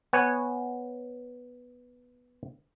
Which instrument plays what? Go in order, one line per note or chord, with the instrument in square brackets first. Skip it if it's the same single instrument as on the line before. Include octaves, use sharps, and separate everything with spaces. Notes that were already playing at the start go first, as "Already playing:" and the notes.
[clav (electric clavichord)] B3 C#5 F#5 G#5